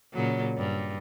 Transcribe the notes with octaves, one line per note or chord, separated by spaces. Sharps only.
A#2 C#3 F#3
G2